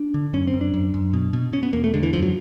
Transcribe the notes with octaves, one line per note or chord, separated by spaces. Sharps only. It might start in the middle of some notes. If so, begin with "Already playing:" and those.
Already playing: D4
D3
F#2 C#4
C4
F#2
D4
F#2
F#2
B2
B2
B2 C#4
B3
E2 A#3
A3
D3 G#3
E3
F#2 F3
F#3